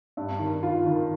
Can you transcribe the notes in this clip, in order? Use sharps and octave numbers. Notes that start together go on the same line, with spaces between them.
G2
D#3
F4
D#3